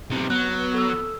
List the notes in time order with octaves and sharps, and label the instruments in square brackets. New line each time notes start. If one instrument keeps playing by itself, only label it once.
[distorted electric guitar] B1 C3
[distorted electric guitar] F#3 [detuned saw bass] B3 [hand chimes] F#6
[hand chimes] A4 E6